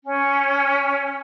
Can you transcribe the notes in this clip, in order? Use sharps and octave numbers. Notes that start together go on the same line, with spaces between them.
C#4